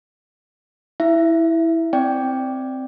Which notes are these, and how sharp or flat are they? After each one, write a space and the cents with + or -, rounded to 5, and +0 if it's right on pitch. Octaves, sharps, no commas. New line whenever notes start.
E4 -5 E5 +25
C4 +0 D5 +0 G5 +0